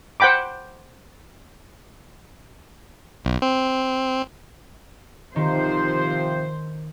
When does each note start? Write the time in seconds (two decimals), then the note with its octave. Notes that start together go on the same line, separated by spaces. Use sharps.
0.20 C5 F#5 G5 B5 D6
3.25 B1
3.42 C4
5.36 C3 D#3 F3 C5